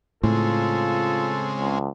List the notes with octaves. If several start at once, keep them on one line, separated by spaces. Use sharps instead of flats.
A2 C#3 G#3 C4 F4 A4
C#2